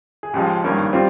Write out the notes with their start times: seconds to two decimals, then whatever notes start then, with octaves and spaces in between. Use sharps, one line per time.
0.23 G#4
0.33 C#2 C#3 F3 G#3 G4
0.64 G#1 G2 G3 A#3 C#4
0.93 G3 C4 F4